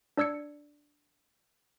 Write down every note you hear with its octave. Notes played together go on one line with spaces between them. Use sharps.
D4 D5 E6 G#6 C#7